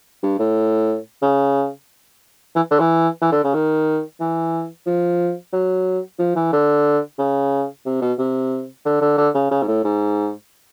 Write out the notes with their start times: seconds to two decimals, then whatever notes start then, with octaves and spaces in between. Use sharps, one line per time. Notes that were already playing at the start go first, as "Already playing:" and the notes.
0.23 G2
0.39 A2
1.22 C#3
2.55 E3
2.71 D3
2.80 E3
3.22 E3
3.32 D3
3.44 C#3
3.54 D#3
4.20 E3
4.87 F3
5.53 F#3
6.19 F3
6.36 E3
6.53 D3
7.18 C#3
7.86 C3
8.02 B2
8.19 C3
8.85 D3
9.01 D3
9.18 D3
9.35 C#3
9.51 C#3
9.63 G#2
9.68 A2
9.84 G#2